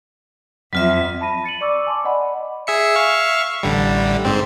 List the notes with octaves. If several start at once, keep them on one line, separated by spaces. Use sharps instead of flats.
F2 F#3 F4 E5
A5 B5 A#6 D#7
A6 C#7 D#7 F#7
D5 C#6 D6 E6
G#5 A5 C6 D6
D5 D#5 F#5 B5
G#4 E5 C#7
E5 F5 C#6
A1 D3 G3
G#2 C4